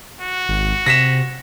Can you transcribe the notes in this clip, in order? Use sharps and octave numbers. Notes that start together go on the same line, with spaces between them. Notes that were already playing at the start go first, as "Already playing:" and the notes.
F#4
G#1
C3 A#6 B6 E7